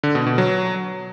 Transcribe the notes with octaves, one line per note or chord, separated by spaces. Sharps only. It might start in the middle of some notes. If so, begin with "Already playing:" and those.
D3
B2
B2
F#3